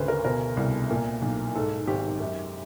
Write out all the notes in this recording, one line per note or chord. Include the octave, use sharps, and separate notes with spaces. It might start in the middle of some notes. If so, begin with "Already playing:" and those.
Already playing: G#1 D2 C#3 B4 C5
A#4
B2 A#4
C2
A#2
B1
G#2 A4
G#1 G4
F#2